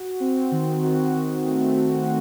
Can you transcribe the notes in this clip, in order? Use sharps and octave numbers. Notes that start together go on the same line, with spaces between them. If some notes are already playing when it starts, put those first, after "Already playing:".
Already playing: F#4
C4
D#3
F#4
D#3
A3
F#4